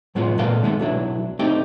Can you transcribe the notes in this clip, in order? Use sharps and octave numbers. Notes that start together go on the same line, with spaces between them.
A2 F#3 G#3 B3 F4
A#2 G#3 A#3 A4 D5 F5
D#3 G#3 A3 B3
B1 F#3 D4 E4
A3 C4 D4 D#4 G4